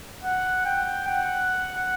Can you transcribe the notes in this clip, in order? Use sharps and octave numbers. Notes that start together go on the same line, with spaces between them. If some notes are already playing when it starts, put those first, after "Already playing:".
F#5
G5
F#5